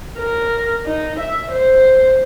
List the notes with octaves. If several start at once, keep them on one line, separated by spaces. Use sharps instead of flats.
A#4
D#4
E5
C5